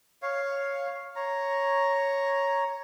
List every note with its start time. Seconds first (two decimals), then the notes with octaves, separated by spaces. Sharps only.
0.22 C#5 F5
1.16 C#5 A#5